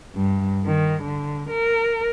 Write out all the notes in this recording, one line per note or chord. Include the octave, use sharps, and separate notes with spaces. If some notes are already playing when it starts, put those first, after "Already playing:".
G2
D#3
D3
A#4